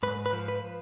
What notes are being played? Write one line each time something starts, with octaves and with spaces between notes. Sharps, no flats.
G#2 B4
B4
F3
B4